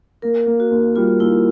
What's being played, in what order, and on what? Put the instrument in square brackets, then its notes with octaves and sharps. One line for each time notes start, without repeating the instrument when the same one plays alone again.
[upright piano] A#3 [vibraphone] A#4
[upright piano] A#3
[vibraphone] F#4
[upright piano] D#2
[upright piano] G3 [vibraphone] F4
[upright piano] D#2 [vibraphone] E4